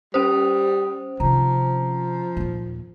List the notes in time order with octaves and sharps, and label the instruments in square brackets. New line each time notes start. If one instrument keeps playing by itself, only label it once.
[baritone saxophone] G3 [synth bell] C#4 C5 [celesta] D#6
[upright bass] C3 D#3 [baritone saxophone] F3 [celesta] A#5
[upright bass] D#2 A#2